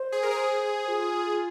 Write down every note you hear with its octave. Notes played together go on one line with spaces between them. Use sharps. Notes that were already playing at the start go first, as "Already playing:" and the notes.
Already playing: C5
G#4
A#4
G#4 C5
F4